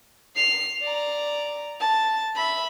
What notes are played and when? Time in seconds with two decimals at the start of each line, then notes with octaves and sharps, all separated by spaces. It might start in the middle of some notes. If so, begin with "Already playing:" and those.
0.36 C7 F7
0.82 D5 A#5
1.80 A5
2.35 E5 B5